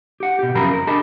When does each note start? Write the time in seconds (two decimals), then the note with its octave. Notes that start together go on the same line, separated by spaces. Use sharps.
0.20 G4 F#5
0.39 B2 G4
0.55 F#2 C#3 F3 F#3 A#4 B5
0.72 F2 A#4
0.87 D4 G4 G#4 D#5 A5 B5